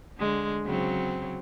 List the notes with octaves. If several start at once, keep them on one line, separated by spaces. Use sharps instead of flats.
D3 G#3
C#3 F#3 C4